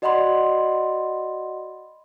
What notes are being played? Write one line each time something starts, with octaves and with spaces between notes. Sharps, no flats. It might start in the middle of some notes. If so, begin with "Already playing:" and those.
F#4 D5 D#5 F#5 B5 C6